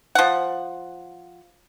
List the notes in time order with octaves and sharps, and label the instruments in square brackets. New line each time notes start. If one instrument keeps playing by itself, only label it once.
[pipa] F3 F#5